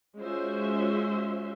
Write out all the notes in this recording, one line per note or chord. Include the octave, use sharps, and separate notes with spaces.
G#3 C#4 F4 F#4 C5 E5